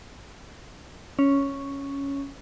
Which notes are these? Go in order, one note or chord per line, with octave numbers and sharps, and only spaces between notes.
C#4